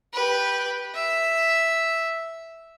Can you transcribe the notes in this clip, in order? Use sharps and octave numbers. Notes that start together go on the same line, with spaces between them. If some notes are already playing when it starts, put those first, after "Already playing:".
G4 B4
E5